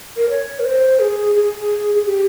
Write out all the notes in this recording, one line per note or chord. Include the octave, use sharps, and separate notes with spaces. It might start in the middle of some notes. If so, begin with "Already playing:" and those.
A#4
C#5
A#4
C5
G#4
G#4
G#4
G4